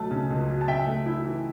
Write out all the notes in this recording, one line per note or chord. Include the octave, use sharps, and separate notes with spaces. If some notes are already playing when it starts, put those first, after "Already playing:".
Already playing: C#2 F#3 A3 A5
C#3
C#2
F#3
A5
C#3 E5 G5
A3
E4
E3